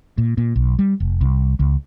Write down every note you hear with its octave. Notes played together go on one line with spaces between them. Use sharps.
A#2
A#2
B1
G3
F1
C2
C#2